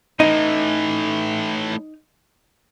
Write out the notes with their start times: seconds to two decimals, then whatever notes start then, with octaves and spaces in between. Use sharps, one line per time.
0.20 A2 E3 D#4